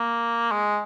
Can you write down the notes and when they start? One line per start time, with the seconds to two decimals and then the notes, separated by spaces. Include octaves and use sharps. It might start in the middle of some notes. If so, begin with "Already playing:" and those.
Already playing: A#3
0.52 G#3